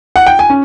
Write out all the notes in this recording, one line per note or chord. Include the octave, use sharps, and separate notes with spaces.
F#5
G5
G#5
C#4